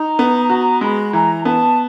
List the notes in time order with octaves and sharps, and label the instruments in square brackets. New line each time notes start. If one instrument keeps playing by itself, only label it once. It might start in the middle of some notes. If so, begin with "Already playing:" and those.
Already playing: [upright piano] D#4 [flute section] A#5
[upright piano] B3
F#4
[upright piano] G#3 [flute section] B5
[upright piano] E3 [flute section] A#5
[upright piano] B3 [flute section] A5